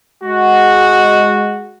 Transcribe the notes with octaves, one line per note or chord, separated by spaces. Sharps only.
G#3 F#4